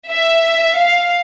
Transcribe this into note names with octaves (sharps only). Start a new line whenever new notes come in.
E5
F5